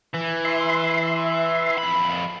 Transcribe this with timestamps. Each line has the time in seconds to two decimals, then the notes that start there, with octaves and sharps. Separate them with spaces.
0.14 E3
0.45 E5 C6
1.78 F2 B5